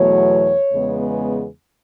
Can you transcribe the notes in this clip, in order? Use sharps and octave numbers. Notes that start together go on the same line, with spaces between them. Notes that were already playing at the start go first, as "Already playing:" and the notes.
Already playing: E2 B2 F#3 A3 C#5
E2 C#3 G#3 B3